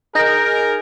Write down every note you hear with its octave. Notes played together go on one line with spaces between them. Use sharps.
D#4 G#4 A#4 G6 A#6